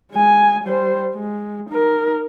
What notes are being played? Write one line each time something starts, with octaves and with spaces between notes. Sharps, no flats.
G#3 G#5
G3 C5
G#3
D#4 A#4